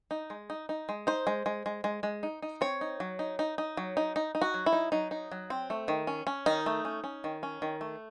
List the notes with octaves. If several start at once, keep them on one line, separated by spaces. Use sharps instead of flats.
D#4
G#3
D#4
D#4
G#3
D#4 C5
G#3
G#3
G#3
G#3
G#3
D#4
D#4
C4 C#5
D#4
F#3
D#4
D#4
D#4
F#3
D#4
D#4
D#4
F#4
F#3
E4
D#4
F#3 D#4
D#4
F#3
C4
A3
D#3
C#4
C#4
D#3 D#4
A3
C#4
C#4
D#3
C#4
D#3
A3